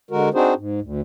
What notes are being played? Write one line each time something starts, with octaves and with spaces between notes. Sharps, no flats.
D3 G#3 F#4 A#4
C4 D4 D#4 F#4 G#4 C5
G#2
D2